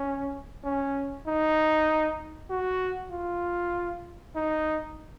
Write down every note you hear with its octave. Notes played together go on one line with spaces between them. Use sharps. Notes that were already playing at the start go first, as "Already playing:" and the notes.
Already playing: C#4
C#4
D#4
F#4
F4
D#4